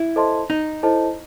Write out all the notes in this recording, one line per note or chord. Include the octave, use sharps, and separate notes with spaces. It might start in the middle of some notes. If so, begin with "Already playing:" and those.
Already playing: E4
A4 C5 D#5 A5 C6
D#4
E4 A4 C5 D#5 A5